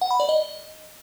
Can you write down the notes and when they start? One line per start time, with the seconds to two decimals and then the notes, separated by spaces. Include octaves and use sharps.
0.01 F#5
0.11 B5
0.20 D5
0.29 D#5